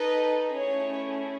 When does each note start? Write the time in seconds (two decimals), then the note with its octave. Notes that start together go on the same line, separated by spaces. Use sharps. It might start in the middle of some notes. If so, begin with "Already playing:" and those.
Already playing: D#4 A4 B4 D#5
0.56 A3 C#4 E4 G#4 C#5